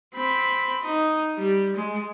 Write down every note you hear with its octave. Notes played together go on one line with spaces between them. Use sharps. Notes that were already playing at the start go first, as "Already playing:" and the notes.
C4 B5
D#4
G3
G#3